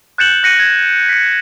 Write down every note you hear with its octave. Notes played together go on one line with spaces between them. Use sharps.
F#6 G6 A6 C#7 E7 F#7
F#6 A#6 C#7 D#7
G#6
B6 C#7